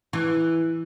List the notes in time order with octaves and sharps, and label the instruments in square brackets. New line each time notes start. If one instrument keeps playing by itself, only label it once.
[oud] E3